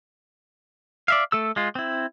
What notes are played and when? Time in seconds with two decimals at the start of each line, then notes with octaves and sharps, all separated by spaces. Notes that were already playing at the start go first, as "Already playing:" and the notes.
1.08 D5 E5 F5
1.32 A3 A4 E6
1.56 G#3 F4
1.75 C4 E4